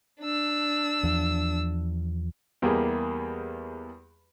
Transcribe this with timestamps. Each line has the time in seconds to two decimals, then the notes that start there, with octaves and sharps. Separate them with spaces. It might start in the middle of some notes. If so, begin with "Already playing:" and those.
0.21 D4 E6
1.03 E2 F3
2.62 E2 G3 A#3 G4 G#4